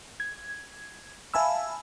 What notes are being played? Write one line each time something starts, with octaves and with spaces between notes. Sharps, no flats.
G#6
E5 F5 G#5 A5 B5 E6